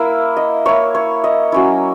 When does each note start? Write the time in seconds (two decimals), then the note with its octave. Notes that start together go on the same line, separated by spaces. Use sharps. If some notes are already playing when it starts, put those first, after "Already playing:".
Already playing: A#3 E4
0.37 D#5
0.65 A#3 E4 C#5
0.95 C#5
1.24 D#5
1.52 F#3 C#4 E4